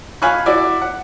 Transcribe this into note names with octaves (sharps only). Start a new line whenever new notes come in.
F5 G#5 B5 C#6 F#6
E4 F#4 D5
F#5